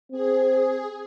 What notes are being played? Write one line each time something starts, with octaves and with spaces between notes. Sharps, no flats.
C4 G#4